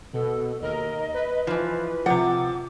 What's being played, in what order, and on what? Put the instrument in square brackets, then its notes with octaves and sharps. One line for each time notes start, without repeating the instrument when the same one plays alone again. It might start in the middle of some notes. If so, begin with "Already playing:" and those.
[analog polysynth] B2 [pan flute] A4
[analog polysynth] D#2 A#4 [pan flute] D#5
[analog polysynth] B4
[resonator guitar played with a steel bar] E3 F3
[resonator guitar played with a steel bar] C3 F#5 [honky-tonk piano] F3 [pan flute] D6